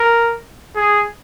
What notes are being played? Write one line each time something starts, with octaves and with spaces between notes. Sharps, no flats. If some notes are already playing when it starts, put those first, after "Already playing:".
Already playing: A#4
G#4